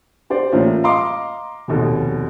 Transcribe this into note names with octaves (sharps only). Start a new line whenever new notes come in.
G4 C5 D5
A2 E3 A#3 C#4 F4
D#5 F5 A#5 C6 D6
F1 D#2 B2 A4